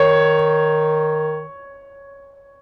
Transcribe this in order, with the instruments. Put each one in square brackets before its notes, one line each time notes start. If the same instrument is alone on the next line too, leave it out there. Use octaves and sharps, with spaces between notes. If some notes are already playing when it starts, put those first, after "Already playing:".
Already playing: [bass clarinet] D#3 [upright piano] C#5